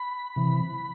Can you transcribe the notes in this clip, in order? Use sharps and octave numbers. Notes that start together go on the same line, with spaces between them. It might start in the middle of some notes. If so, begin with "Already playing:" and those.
Already playing: B5
C3 E3